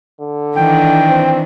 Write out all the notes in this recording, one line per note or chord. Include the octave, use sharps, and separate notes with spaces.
D3
D#3 E3 D4 G5
C4